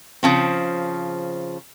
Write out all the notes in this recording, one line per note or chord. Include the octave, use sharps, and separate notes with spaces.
C#3 F3 C4